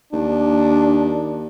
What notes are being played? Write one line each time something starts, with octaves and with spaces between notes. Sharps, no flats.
D#2 D4